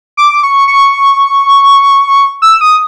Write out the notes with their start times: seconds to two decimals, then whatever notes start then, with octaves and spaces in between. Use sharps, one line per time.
0.17 D6
0.43 C#6
0.68 C#6
2.42 E6
2.61 D#6